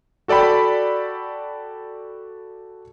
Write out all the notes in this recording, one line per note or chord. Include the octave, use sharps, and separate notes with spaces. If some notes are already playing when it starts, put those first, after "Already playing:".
F#4 A4 D5 G5 B5